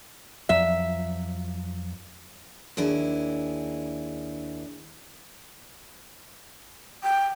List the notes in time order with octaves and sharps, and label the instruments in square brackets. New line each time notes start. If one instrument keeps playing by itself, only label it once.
[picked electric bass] F2 F3 F#3 [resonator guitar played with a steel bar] E5
[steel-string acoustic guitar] D#2 D4 E4 G#4
[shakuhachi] G5